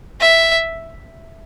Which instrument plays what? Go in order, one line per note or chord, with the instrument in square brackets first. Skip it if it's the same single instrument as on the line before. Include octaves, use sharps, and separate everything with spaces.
[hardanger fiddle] E5